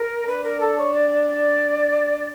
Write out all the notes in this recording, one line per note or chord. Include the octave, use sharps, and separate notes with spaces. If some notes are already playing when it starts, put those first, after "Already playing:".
Already playing: A#4
D4 B4
A#4
A4
C#5
D5
D5
D5